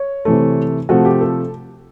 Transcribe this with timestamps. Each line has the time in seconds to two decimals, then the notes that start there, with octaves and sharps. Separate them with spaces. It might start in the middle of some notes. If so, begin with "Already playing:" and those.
Already playing: C#5
0.25 C3 E3 A3
0.89 C3 F3 A3 F#4
1.05 G4
1.21 A4